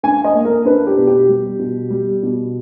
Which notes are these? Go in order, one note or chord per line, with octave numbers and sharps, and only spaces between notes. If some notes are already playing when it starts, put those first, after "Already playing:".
D4 G#5
D#5
A#3
A#4
D4 B4
G4
B2
G4
G3
B2
G3
B2